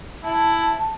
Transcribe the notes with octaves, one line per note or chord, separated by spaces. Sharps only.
E4 A5